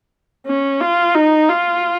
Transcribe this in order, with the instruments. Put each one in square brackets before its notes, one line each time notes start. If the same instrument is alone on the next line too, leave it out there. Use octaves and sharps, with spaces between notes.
[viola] C#4
F4
D#4
F4